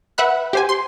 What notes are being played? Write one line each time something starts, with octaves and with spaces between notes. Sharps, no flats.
B4 E5 F#5 B5 F#6
G4 C5 G#5
C6